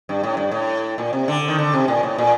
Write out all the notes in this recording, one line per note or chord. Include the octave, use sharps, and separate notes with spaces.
G2
A2
G2
A2
A#2
C3
D3
D#3
D3
C3
A#2
A2
A#2